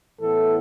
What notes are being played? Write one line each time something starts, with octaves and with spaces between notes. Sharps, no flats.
A2 E3 B3 A4